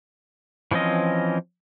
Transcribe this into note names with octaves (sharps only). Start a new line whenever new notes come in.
E3 F3 C4 C#4 D#5